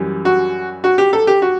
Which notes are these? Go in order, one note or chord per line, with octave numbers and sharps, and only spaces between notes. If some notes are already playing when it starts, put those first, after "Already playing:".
Already playing: F#2 E3 G3
F#4
F#4
G4
A4
G4
F#4